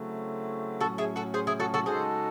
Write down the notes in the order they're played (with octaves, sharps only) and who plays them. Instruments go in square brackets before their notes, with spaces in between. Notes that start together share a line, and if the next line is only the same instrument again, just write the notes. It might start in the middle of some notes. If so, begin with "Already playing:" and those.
Already playing: [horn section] C#3 F#3 A3 C4 E4
[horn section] A2 F#3 C#4 [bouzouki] F#4 A4
[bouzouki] E4 G#4
F#4 A4
G#4 C5
E4 G#4
F#4 A4
F#4 A4
[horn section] C#3 G#3 D#4 F#4 A4 [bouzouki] G#4 C5